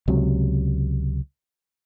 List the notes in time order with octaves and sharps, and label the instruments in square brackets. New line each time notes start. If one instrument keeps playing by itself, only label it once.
[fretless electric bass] C#2 C3 F#3